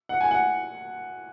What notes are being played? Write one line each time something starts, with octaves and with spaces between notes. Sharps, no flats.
F#5
G#5
F#5